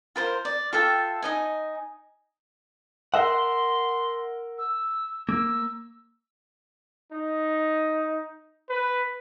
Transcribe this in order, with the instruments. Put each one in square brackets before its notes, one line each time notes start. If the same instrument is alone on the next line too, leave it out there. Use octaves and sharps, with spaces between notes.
[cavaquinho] F4 A#4 C5
D5
F4 A4 E5 G5
D#4 D#5 G#5
[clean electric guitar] A#4 E5 F#5 [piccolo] C6
[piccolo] E6
[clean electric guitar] A#3 [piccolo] E6
[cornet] D#4
B4